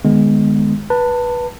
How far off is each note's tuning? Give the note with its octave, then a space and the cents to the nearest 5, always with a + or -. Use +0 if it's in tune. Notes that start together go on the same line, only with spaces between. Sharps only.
D#3 -45 G#3 +0 B3 +0
B4 -15 A5 +25